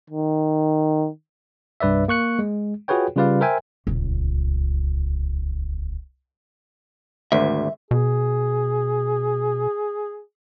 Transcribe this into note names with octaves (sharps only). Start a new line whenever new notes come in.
D#3
C2 G2 B4 D5 E5
A#3 C#6 F#6 C#7
G#3
F4 F#4 G#4 B4 C#5 G5
C#3 G3 F4 B4 D5 F5
A#4 C5 E5 G5 G#5
D#1 C#2
G#1 D2 E5
B2 G#4